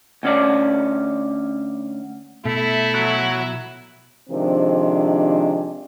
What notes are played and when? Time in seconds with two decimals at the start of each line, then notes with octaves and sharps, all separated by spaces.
0.23 D2 C#4 D5
2.45 B2 A3 E4
2.95 F#3 F#4
4.30 C3 D#3 F3 G#3 C4 D4